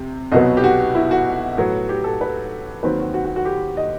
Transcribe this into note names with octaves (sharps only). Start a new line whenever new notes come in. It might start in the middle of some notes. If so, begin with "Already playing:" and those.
Already playing: C3
C2 B2 F#3 B3 D#5
G4
F#4
E4
F#4
A2 F#3 B3
G4
A4
B4
D#2 D#3 F#3 C4 B4
F#4
F#4
F#4
F#4
G4
D#5